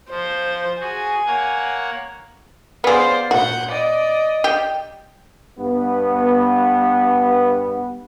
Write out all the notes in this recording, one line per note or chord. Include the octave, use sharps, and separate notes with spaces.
F3 C5
F#4 G#4 G#5
A#3 C#5 F#5
B3 G#4 C5 D5 F5
A#2 F#4 F#5 G6
D5 D#5
G4
G2 B3